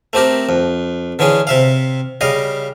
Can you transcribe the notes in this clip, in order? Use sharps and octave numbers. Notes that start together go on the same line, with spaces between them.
A3 C4 G4 A#4
F2
D3 E3 C#4 G#4
C3 E5 F5
C#3 G3 D#5 F5